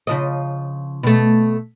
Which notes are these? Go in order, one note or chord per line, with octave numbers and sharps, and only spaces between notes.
C#3 F3 D#5
B2 A3